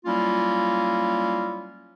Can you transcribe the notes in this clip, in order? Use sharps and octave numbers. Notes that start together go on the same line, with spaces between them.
F#3 G3 A#3 C#4 E4 F4